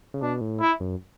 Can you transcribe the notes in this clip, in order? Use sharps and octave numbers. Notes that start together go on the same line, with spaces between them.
C#3
B2 D4
A2
E4
F#2